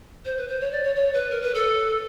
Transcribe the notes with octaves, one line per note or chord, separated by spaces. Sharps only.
C5
B4
C5
C#5
D5
C#5
C#5
B4
A#4
B4
A4